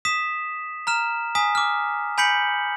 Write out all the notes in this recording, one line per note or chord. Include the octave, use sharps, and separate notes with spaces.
D#6 B6 E7
A#5 F6 E7
G#5 D#6 B6
D6 F6
G#5 B5 G6 B6 C#7 F#7